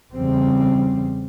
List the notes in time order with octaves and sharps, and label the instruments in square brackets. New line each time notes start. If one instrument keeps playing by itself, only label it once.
[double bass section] E2 C#3 G3 C4